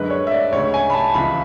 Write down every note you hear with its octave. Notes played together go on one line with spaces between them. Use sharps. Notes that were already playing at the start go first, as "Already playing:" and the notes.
Already playing: F#2 D3 G#3 B4
C#5
E5
D5
D2 C#3 G#3 C#5
G#5
B5
A5
C#2 C#3 E3 B5